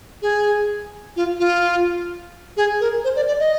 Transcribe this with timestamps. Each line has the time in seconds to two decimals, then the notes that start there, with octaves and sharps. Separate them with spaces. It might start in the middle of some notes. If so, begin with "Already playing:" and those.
0.22 G#4
1.16 F4
1.40 F4
2.57 G#4
2.81 A#4
3.04 C5
3.16 D5
3.28 D5
3.40 D#5